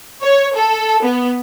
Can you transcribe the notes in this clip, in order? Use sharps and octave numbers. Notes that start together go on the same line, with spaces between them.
C#5
A4
B3